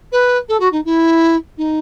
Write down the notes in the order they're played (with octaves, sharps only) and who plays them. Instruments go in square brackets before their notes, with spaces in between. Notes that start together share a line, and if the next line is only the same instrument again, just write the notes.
[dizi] B4
A4
F#4
D#4
E4
D#4